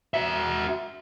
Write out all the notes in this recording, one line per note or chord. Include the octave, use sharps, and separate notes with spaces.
F#4 E5